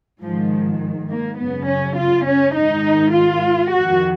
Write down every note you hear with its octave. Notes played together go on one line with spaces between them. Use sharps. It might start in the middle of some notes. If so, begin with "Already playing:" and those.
G#2 D#3 F3
A#3
F#2 C#3 B3
C#4
F4
C#4
G#2 D#3 D#4
F4
F2 D#3 F#4